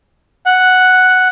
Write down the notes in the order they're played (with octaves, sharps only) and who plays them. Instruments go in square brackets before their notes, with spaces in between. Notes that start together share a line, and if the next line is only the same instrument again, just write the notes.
[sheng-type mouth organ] F#5